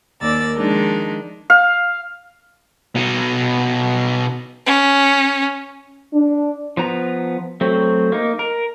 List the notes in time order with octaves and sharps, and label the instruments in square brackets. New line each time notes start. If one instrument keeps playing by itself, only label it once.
[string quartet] D#2 A#4 D5 E6 A6
D#3 F3 G#3 D4 D#4
[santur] F5
[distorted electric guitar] B2 D#4
[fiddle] C#4
[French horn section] D4
[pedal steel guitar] F3 B3 A#5
F#3 A3 C4
A#3 D#4
A#4